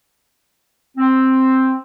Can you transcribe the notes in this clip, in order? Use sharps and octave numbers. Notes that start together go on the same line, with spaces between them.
C4